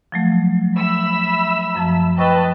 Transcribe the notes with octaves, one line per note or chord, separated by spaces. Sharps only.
F3 F#3 A3
E5 B5 E6
F#2 F3 A5
B4 D#5 G5 A5 C#6 E6